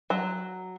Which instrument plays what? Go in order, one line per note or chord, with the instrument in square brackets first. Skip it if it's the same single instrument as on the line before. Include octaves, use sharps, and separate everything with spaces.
[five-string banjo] F#3